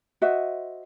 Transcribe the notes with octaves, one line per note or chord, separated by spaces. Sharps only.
F#4 C5 D#5 E5